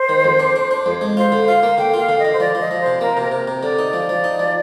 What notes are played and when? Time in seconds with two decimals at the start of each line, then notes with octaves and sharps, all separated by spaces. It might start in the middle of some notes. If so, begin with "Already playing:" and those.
Already playing: C5
0.09 D#3
0.25 F2
0.40 D4
0.56 D4
0.71 D4
0.86 F2
1.01 G#3
1.17 F4 C5
1.32 D3
1.47 F4 F5
1.63 A#3
1.78 D3 G5
1.94 F4
1.99 F5
2.09 D3
2.19 D#5
2.25 D3
2.33 C5
2.40 F3 D5
2.55 F3
2.60 D#5
2.71 F3
2.80 C5
2.86 C3
3.01 A#3 A#4
3.17 C3
3.22 A#4
3.31 C3
3.48 C3
3.63 D3 D5
3.79 D#4
3.93 F3
4.09 F3
4.24 D#4
4.39 F3